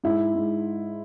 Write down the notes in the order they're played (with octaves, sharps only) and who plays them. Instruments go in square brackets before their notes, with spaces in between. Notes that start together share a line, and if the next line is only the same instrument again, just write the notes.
[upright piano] G#2 E4
G#2